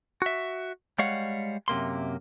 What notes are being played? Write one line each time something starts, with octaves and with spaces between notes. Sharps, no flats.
F#4 E5
G3 G#3 C#5 F5 F#5
F#2 C3 A#3 C6